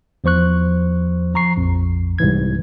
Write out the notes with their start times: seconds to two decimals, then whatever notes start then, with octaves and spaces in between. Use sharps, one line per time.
0.24 E2 F3 C5 C#6 F#6
1.34 F3 A#5 C#6 C7
1.57 A#1 F2
2.18 C2 G#2 E3 G#6